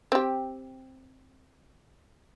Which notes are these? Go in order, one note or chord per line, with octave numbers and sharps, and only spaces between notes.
C4 G4